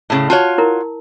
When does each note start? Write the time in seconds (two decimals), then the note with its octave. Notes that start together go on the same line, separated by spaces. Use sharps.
0.10 A2 C#3
0.30 F4 F#4 C#5 A5
0.58 E4 A#4